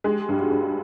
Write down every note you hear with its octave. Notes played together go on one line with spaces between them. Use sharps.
G#3 G4
G2 G4
F#4
G2